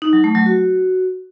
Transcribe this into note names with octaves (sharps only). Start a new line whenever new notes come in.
D#4
F#3
A3
F#3
F#4